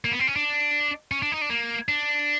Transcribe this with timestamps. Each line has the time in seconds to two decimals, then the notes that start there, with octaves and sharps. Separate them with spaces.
0.05 A#3
0.11 B3
0.19 C4
0.27 C#4
0.36 D4
1.12 C#4
1.22 D4
1.32 D#4
1.41 D4
1.50 A#3
1.88 D4